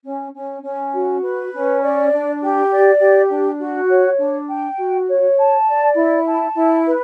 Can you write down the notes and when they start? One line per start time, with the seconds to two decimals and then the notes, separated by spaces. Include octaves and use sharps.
0.03 C#4
0.33 C#4
0.62 C#4
0.92 F#4
1.22 B4
1.52 C#4
1.82 D5
2.11 D4
2.41 G4
2.71 D5
3.00 G4
3.29 D4
3.60 F#4
3.89 C#5
4.18 D4
4.48 G5
4.77 F#4
5.08 C#5
5.37 A5
5.67 D5
5.96 E4
6.26 A5
6.55 E4
6.86 B4